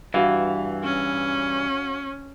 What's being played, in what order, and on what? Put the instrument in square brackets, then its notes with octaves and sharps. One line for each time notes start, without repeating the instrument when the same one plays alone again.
[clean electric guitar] G2 E3 [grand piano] F#4 F5
[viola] C#4